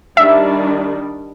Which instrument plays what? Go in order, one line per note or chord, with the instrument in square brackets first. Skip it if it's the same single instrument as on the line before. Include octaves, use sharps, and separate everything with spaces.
[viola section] D#3 G3 D4 [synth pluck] E5